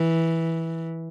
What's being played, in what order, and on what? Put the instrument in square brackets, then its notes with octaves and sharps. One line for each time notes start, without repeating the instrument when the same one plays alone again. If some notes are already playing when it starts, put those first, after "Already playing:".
Already playing: [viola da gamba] E3